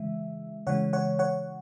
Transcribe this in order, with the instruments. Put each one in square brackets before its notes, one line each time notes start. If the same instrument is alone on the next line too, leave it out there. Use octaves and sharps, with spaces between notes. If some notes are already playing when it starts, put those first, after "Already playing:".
Already playing: [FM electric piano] C#3 E3 G#3 E5
C#3 E3 G#3 C#5 F#5
C#5 F#5
C#5 F#5